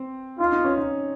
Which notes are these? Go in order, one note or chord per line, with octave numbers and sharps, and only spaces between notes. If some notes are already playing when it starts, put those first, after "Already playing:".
Already playing: C4
D#4 F4
D#4
C#4
D#4